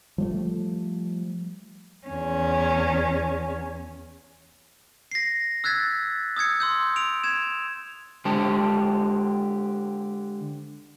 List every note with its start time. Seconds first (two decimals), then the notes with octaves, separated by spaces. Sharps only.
0.18 F3 G3 A3
2.07 E2 C#4
5.12 A#6 C7
5.64 E6 F#6 G#6 A6 B6
6.37 D#6 E6 G#6 C#7
6.60 C6 E6 G6
6.96 D7 F7
7.24 G#6 E7
8.25 D3 G#3 G4 C5 A5